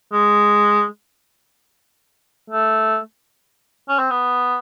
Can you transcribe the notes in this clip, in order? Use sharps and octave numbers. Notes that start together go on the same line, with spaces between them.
G#3
A3
C#4
C4
B3